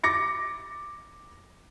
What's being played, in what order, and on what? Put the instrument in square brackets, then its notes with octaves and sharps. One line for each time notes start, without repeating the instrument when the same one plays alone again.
[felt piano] D6 A6 A#6 C#7